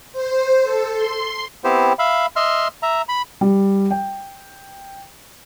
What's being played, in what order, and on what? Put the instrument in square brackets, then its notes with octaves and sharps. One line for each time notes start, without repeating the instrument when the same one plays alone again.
[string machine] C5
A4
C6
[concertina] B3 C4 E4 G4 C5
E5 F5 B5
D#5 E5 C6 F6
E5 A#5
B5
[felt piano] G3
G5